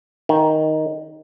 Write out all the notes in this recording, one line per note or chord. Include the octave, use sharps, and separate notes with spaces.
D#3